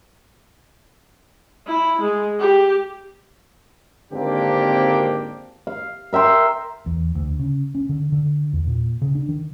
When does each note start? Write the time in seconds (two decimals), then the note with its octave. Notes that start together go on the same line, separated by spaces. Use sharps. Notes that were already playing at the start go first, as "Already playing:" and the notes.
1.67 E4
2.02 G#3
2.40 G4
4.12 G#1 D3 A#3 C4 D4 G4
5.67 F5
6.13 A#4 E5 G5 C6
6.86 E2
7.15 D2
7.40 C#3
7.75 C#4
7.89 D3
8.12 D3
8.53 E2
8.67 A#2
9.01 C#3
9.15 D4
9.29 D#3